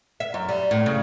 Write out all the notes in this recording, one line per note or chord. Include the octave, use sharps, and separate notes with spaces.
E5
F#2
G3
A2
C#3